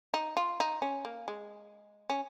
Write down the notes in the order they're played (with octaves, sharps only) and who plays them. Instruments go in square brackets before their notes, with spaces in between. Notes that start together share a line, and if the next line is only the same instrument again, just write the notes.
[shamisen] D#4
F4
D#4
C#4
A#3
G#3
C#4